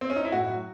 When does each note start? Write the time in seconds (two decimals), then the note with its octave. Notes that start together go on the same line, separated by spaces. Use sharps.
0.01 C4
0.10 C#4
0.16 D#4
0.25 E4
0.32 A2 F#4
0.49 F#3